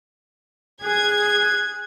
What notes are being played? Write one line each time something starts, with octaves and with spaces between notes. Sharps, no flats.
G#4 F#6 G#6